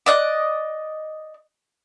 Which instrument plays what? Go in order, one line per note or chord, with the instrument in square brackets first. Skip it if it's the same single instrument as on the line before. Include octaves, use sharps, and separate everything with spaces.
[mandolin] D5 D#5 F#6